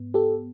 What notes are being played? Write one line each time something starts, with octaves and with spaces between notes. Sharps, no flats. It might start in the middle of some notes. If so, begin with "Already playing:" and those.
Already playing: G#2 B3
G4 A4